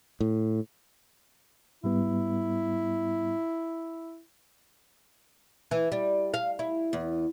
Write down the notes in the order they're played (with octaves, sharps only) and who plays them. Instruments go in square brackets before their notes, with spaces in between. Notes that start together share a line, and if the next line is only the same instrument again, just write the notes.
[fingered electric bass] A2
[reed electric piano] G#2 G3 B3 [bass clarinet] E4
[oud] E3
G3
F5
E4
E2